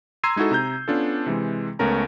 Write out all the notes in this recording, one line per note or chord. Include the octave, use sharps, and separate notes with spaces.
A#5 C6 E6 G#6 C7 D#7
G#3 D#4 E4 F#4 A4
C3 A#5 G6
B3 C#4 D4 F4 A4
C3 E3 G#3
C#2 A3 B3 C#4 A#4 A#5